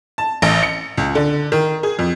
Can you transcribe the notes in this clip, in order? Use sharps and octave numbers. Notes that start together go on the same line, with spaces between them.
A5
A1
C#7
C#2
D3
D#3
G#4
F2